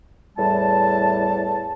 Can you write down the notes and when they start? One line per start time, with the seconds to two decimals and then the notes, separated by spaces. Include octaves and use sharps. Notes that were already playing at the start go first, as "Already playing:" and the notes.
0.37 E2 A2 G3 A5